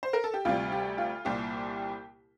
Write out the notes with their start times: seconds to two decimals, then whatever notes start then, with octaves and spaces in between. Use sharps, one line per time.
0.03 C5
0.13 A#4
0.24 A4
0.34 G4
0.45 D2 C3 G3 F4
0.72 G4
0.98 F4
1.25 C2 A#2 G3 G4